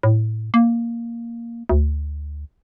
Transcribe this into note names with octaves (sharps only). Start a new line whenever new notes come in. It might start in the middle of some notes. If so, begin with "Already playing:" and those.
A2
A#3
D2